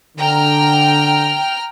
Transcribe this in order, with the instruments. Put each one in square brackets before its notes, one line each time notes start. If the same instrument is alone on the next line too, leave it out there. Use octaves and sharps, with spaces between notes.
[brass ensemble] D3 [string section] G5 A#5 F6